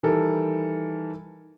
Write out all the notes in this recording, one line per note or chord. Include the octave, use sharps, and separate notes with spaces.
D#3 E3 G3 A4 A#4